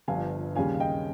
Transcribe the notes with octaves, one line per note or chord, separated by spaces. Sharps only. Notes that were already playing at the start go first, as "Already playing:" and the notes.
G1 G2 F3 F5 G#5
D#2 C#3 G3 C#4 F5 G#5
F5
D#5 G5